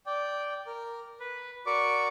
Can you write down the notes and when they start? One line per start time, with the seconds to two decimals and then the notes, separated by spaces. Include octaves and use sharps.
0.06 D5 G5
0.67 A#4
1.20 B4
1.66 F#4 A#4 D5 C#6 D6